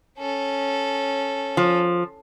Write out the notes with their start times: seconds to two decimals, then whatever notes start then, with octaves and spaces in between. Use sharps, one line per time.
0.17 C#4 A4
1.57 F3